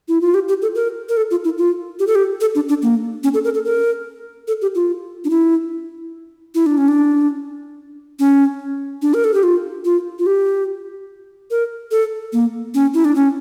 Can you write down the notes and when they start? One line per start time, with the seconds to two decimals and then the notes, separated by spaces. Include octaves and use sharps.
0.08 E4
0.21 F4
0.34 G4
0.48 G4
0.62 A4
0.75 A#4
1.09 A#4
1.17 A4
1.31 F4
1.44 E4
1.58 F4
1.99 G4
2.07 A4
2.15 G4
2.41 A4
2.55 D4
2.69 D4
2.82 A#3
3.24 C#4
3.34 A4
3.44 A#4
3.54 A4
3.65 A#4
4.48 A4
4.62 G4
4.75 F4
5.25 D4
5.30 E4
6.55 E4
6.66 D4
6.78 C#4
6.88 D4
8.19 C#4
9.02 D4
9.14 A#4
9.24 A4
9.34 G4
9.43 F4
9.85 F4
10.19 F4
10.26 G4
11.51 A#4
11.91 A4
12.33 A#3
12.74 C#4
12.94 E4
13.05 D4
13.15 C#4